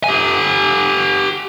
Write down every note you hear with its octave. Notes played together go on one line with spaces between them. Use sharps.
G4 G#5